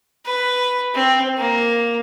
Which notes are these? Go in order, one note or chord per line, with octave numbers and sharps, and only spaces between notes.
B4
C4
A#3